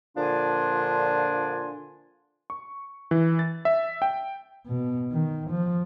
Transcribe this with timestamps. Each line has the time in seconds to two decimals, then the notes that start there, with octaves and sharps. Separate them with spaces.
0.17 A#2 D3 F3 D4 G#5 C6
2.50 C#6
3.11 E3
3.39 A6
3.65 E5
4.02 G5
4.66 B2
5.12 D#3
5.51 F3